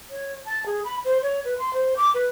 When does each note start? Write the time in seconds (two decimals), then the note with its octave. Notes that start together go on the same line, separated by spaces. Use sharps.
0.10 C#5
0.45 A5
0.66 G#4
0.84 B5
1.05 C5
1.22 C#5
1.45 B4
1.58 C6
1.73 C5
1.97 D6
2.14 B4